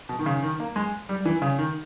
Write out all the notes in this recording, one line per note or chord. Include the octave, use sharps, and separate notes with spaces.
B2
D#3
C#3
D#3
A#3
G#3
G3
E3
C#3
D#3